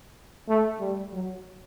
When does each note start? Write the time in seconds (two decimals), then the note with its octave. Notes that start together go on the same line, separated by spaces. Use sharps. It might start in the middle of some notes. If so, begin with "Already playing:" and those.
0.48 A3
0.80 G3
1.12 F#3